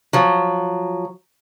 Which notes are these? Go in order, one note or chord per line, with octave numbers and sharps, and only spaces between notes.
F3 F#3